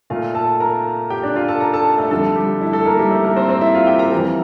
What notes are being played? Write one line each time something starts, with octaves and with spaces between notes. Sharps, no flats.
A#2 A3 F4 F5
A4 A5
A#4 A#5
G4 G5
D4 D5
F4 F5
A4 A5
A#4 A#5
A4 A5
A3 A4
F2 D3 G3 A3 A4
G3 G4
E4
A3 A4
A#3 A#4
G3 G4
A3 A4
A#3 A#4
C4 C5
C4 C5
E4 E5
F4 F5
G4 G5
A#4 A#5
F2 E3 G3 A#4 A#5